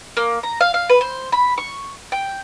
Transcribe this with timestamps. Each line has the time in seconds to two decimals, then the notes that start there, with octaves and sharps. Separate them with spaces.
0.17 A#3
0.43 A#5
0.61 F5
0.74 F5
0.89 B4
1.01 C5
1.32 B5
1.58 C#6
2.12 G5